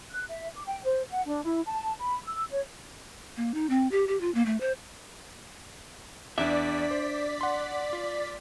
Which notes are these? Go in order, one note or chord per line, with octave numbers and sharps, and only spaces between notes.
F#6
E5
D6
G5
C5
F#5
D4
E4
A5
B5
E6
C#5
A#3
D#4
C4
G4
G4
F4
A#3
A3
C5
E2 D4 D5 E5 B6
C5
F#5 C6
F4